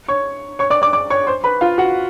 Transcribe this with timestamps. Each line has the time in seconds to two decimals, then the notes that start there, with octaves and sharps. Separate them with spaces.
0.08 C#5 C#6
0.59 C#5 C#6
0.70 D5 D6
0.82 D5 D6
0.93 D5 D6
1.10 C#5 C#6
1.27 C5 C6
1.44 B4 B5
1.61 F4 F5
1.78 F#4 F#5